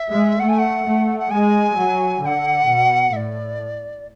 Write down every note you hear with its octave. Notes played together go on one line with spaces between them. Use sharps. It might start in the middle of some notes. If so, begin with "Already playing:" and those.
Already playing: E5
G#3
A3 F#5
G#5
F#5
A3
F#5
G#3 G#5
F#3
D3 F#5 G#5
B2
A2 D5 E5